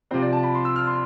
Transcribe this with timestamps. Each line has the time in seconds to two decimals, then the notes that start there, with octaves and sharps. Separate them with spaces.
0.11 C3 F3 C4 C5
0.21 D5
0.33 A5
0.43 B5
0.55 C6
0.65 E6
0.76 F6
0.87 C6